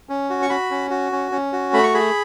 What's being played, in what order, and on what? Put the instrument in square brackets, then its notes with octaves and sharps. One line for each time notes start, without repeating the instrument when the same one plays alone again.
[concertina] C#4
F#4
C#6
F#4 B5
C#4
F#4
C#4
C#4
F#4
A3 B5
C#6
G#4 B5